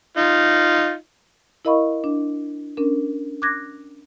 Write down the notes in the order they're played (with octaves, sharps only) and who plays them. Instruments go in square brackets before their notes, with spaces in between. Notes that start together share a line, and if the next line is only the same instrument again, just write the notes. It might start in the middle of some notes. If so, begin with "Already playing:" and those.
[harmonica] D#4 F4
[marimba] E4 A#4 D#5 F5 B5 C#6
D4
C#4 D4 A#4
D6 F#6 G#6 A#6